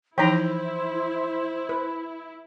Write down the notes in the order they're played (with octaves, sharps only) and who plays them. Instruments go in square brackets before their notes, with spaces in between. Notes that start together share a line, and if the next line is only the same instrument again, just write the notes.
[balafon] E3 F3 D#4 [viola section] E4 [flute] C5 [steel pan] G5 A#5
[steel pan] B4